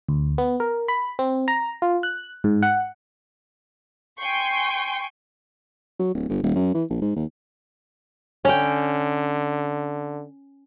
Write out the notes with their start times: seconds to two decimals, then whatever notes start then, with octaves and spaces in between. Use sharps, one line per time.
0.09 D2
0.38 B3
0.60 A#4
0.88 B5
1.19 C4
1.48 A#5
1.82 F4
2.03 F#6
2.44 G#2
2.63 F#5
4.20 G5 G#5 C6 C#6
5.99 F#3
6.14 D1
6.29 G1
6.43 D#1
6.55 F#2
6.74 E3
6.90 A#1
7.02 G#2
7.16 D#2
8.45 D3 C#4 G5